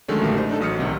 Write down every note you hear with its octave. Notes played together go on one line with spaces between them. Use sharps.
D3 D#3 F#3 G#3 A3 C#4
A#1 F#3 A3 A#3 G4 A#4
D#4 C5
D4 D#4 A4
A1 F#3 D#6 F6 C#7
C2 C3 D#3